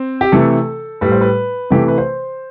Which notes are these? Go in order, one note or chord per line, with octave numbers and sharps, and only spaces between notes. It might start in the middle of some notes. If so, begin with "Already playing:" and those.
Already playing: C4
G4
C3 E3 A3 A4
A2 G3 B4
C5
B4
C3 E3 A3 G4
B4
C5